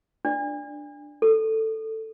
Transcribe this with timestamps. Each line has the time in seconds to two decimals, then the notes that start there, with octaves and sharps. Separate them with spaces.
0.25 D4 D5
1.22 A4